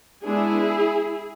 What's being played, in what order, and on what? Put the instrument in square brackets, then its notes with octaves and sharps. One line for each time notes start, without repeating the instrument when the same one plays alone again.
[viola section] G#3 B3 D4 E4 G#4